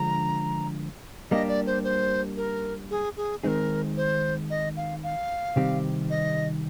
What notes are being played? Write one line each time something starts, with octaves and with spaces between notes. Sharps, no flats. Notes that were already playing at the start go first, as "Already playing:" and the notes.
Already playing: D3 F3 G#3 D4 A#5
G3 A#3 D4 G4 D#5
D5
C5
C5
A#4
G#4
G#4
D#3 G#3 C4 D#4 G#4 A#4 C5
C5
D#5
F5
F5
C3 D#3 G3 C4 G4
D#5